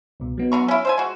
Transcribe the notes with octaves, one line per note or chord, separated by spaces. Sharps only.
C2 B2
F#3 B3 D#4
D3 A#5 C#6
C#4 E4 D5
C5 E5 G#5
G#3 F#4